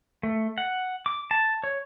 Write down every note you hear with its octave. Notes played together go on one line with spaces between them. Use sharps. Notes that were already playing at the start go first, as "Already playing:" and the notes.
A3
F#5
D6
A5
C#5